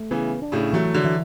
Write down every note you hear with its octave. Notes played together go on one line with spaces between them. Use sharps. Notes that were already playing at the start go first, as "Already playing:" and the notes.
Already playing: A3
C#3 E3 B3
D4
A2 C#3
E3 F#3 A3
D3 F#3
E3